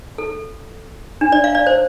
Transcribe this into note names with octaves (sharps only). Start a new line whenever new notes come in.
A4
D4
D5
F5
D5
C5